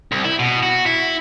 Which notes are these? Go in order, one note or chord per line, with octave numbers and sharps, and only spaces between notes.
C2
E4
B2
F#4
E4